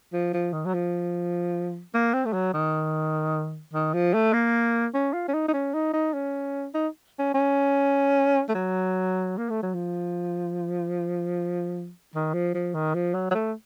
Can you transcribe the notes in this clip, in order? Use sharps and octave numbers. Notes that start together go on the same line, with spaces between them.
F3
F3
D#3
F#3
F3
A#3
C4
A3
F#3
D#3
D#3
F3
A3
A#3
C#4
F4
C#4
D#4
D#4
C#4
D#4
D#4
C#4
D#4
C#4
C#4
A3
F#3
A#3
A3
F#3
F3
D#3
F3
F3
D#3
F3
F#3
F#3
A3